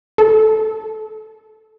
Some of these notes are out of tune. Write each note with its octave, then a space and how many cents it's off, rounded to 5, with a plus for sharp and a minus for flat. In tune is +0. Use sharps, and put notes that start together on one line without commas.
A4 -10